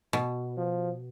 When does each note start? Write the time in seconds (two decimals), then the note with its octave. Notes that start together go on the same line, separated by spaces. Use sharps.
0.13 B2
0.57 F3